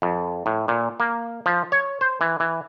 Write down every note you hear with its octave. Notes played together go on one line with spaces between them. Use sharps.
F2
A2
A#2
A#3
F3
C#5
C5
E3
E3